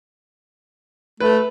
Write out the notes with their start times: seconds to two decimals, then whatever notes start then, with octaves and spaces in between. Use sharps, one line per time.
1.20 A3 B4